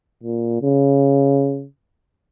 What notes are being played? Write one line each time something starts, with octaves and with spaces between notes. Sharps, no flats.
A#2
C#3